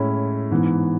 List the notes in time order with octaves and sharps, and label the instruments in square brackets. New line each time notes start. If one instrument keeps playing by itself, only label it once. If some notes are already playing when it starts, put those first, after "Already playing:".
Already playing: [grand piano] A2 G#3 C#4 E4
G#2 E3 B3